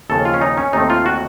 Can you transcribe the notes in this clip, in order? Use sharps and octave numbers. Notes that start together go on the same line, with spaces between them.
D#2 C#3 F3 A4
F4
C#4
D#4
C#4
D#2 D#3 A3 C4 D#4
F4
F#4